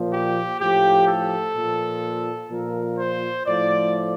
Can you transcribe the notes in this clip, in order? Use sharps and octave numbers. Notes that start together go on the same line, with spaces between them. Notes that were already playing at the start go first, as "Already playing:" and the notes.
Already playing: A#2 F3
G4
A2 F3 G4
A4
A#2 F3
A#2 F3 A#4
C5
A2 F3 D5